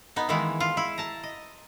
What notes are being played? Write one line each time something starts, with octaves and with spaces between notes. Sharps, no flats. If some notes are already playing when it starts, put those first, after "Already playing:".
B3 D#4
D#3 E3 G#3 A#3 B3 E4
F4
E4
A5 A#5
D#5